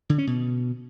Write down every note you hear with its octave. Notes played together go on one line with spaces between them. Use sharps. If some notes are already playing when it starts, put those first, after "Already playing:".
D3
C#4
B2